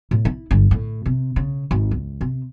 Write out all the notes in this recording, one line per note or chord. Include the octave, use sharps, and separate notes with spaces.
A2
E4
G1
A2
C3
C#3
G#1
C#2
C3